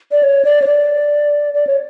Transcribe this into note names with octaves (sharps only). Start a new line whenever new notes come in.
D5
C#5
D5
C#5
D5
D5
C#5